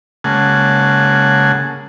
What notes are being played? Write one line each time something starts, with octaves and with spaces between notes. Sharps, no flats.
C#3 G#3 A#3 F#5 G#5 A5